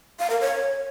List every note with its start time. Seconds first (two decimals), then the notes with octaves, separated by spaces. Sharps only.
0.19 F5
0.30 A#4
0.41 C#5